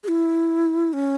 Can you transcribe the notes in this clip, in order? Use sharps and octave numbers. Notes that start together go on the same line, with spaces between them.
G#4
E4
C#4